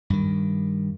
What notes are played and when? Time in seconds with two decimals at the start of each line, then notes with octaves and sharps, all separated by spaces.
0.10 G2 D#3